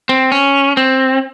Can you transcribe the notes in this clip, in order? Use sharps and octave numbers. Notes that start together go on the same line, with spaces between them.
C4
C#4
C4